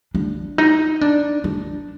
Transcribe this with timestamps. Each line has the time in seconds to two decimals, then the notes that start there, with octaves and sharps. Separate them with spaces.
0.15 D4
0.58 D#4
1.01 D4
1.44 D4